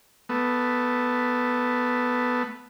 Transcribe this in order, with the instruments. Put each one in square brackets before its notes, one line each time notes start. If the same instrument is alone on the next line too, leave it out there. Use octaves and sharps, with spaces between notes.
[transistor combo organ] A3 B3